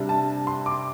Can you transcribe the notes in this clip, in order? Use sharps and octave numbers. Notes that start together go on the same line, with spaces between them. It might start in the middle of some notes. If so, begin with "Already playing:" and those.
Already playing: C3 G3 D4
A5
C6
D6